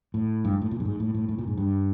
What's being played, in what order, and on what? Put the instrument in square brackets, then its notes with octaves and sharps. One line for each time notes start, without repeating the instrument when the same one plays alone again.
[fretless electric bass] A2
G2
G#2
A2
A#2
G2
G#2
A2
A2
A2
A#2
G#2
G2